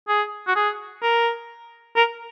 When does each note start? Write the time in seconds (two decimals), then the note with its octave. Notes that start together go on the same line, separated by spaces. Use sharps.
0.08 G#4
0.47 F#4
0.56 G#4
1.02 A#4
1.96 A#4